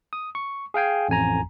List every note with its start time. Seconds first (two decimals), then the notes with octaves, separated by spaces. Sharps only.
0.13 D#6
0.35 C#6
0.74 G#4 F5 G5 G#5
1.09 A1 F2 G#5 A#5